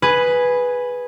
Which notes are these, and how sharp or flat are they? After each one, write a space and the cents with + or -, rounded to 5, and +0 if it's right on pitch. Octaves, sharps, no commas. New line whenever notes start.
G#4 +0 B4 +0